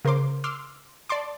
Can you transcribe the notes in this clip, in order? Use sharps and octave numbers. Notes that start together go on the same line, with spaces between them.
C#3 A#4 C5 C6 D6
C6 D6 E6 F6
D5 A5 C6 D6